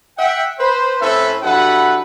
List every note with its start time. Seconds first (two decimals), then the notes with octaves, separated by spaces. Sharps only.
0.18 E5 F#5 G5
0.60 B4 C5
1.01 A2 C4 C#4 A4 B4 E5
1.43 G2 F#3 E4 A4 B4 F#5